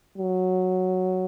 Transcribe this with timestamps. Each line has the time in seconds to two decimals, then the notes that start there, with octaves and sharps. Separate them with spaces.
0.18 F#3